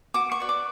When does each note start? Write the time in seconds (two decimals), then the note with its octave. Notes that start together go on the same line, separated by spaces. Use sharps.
0.14 F#4 D6
0.32 C#6
0.40 B4 D5
0.49 D6